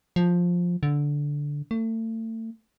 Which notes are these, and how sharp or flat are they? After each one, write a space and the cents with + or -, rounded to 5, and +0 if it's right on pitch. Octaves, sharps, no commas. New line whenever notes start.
F3 +10
D3 -10
A3 +35